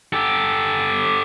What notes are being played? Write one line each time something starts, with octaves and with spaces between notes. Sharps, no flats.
G4 A4